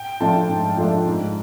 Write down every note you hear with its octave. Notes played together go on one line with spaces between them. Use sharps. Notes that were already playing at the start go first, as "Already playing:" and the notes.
Already playing: G5
F3 A3 D4 F4 A5
G#2
F3 A3 D4 F4
G#2